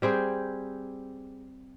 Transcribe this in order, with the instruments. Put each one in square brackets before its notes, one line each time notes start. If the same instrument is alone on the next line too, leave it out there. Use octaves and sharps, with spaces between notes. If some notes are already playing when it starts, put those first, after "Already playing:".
[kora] G3 C4 G#4 G5